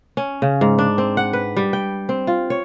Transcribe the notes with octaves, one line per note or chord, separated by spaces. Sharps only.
C#4
C#3
G#2
D4
C4
F#5
B4
G3
G5
C4
F4
C#5